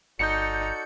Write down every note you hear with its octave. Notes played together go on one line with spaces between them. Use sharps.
G1 D#4 F#4 A4 D5 G6 C#7